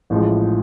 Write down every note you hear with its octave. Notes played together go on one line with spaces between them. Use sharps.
A1 A2 F3 G#3